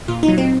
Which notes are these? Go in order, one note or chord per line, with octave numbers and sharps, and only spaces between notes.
A#2 F4
D#4
F#3
C4